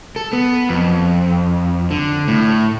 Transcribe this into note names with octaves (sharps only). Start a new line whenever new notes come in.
A4
B3
F2
D3
A2